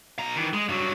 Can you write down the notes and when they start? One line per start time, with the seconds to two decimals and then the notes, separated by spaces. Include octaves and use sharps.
0.19 B2 A#5
0.35 D#3 E3
0.54 G#3
0.69 G2 F#3